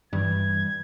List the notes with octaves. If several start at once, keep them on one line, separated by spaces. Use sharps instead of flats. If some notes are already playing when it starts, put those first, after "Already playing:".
G2 E3 G3 G#6